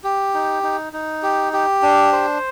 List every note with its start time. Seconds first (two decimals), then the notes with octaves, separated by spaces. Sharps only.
0.04 G4
0.34 D#4
0.63 D#4
0.93 D#4
1.23 G4
1.53 G4
1.82 D4
2.12 C5